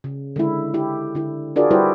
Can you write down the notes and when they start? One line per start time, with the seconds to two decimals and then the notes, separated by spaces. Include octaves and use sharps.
0.04 C#3
0.36 D3 G#3 E4
0.74 E4 G4
1.15 D3 E4
1.56 D4 F4 F#4 G#4 A#4 D5
1.71 G3 E4 F#4 G4 B4 C5